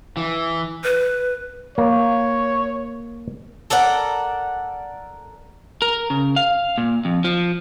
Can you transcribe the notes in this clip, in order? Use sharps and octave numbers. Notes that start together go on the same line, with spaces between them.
E3
B4
A#3 C#5
A4 A#4 D5 F#5
A#4
C#3
F5
A#2
F2
F3